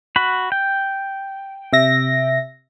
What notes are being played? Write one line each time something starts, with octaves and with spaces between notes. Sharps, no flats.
F#4 B5
G5
C3 E5 A#6